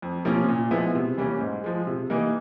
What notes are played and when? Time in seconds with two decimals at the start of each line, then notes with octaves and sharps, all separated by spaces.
0.02 F2
0.25 C3 F3 A#3 C#4
0.48 A#2
0.71 F3 G#3 B3 E4
0.95 C3
1.17 E3 G3 A#3 C#4
1.40 G#2
1.64 F3 G#3
1.87 C3
2.10 E3 G3 A#3 D#4